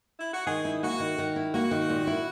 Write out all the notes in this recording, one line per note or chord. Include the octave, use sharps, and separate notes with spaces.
E4
F#4
D#3 G#4
E4
A#3 F#4
D#3
D#3
E4
A#3 F#4
D#3
A#2
E4